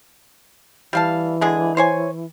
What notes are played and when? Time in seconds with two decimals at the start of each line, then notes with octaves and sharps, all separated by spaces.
0.93 E3 G3 F5 A5
1.41 D3 G#3 G#4
1.77 C5 C#5 G#5